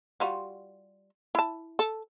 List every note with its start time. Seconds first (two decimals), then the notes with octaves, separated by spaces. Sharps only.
0.20 G3 F4 F#4
1.35 E4 A5
1.79 A4